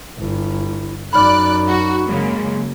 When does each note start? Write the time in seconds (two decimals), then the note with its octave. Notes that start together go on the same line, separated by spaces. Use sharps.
0.18 G1 E4
1.13 F#2 D#4 D5 B5 F6 F#6
1.67 F#4
2.07 C#3 F#3 G#3 A#3